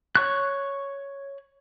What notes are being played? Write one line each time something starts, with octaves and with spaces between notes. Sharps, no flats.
C#5 C#6 F#6